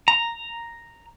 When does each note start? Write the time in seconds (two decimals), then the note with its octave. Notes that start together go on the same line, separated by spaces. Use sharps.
0.08 A#5